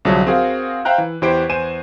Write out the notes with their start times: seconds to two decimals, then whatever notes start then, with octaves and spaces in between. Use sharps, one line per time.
0.05 C2 D3 F3 F#3 G#4 A5
0.27 C4 F#4 G#4 A#4 F5
0.85 C5 E5 F5 G5 A#5 F#6
0.98 E3
1.22 E2 E4 G4 C5 G5 D7
1.49 E2 C5 G#5 D#7 E7